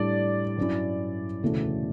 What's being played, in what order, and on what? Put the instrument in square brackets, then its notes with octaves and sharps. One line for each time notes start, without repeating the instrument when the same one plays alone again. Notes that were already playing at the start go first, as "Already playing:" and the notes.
Already playing: [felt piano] A2 G3 D4 [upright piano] D5
[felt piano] G2 F#3 C#4 E4
E1 D2 C#3 E3 A3